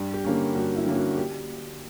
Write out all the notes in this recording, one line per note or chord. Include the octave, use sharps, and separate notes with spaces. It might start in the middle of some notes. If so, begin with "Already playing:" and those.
Already playing: G2
G4
D3 A#3 C#4
A#4
G2 F#4
E4
D3 A#3 C#4
F#4
G4